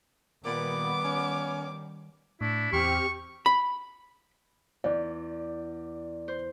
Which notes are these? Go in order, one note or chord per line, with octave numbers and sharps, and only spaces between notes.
A#2 D#3 G3 B3 D6
C#4
A2 D4 E4
E2 C4 G4 C#6 F6
B5
E2 D5
C5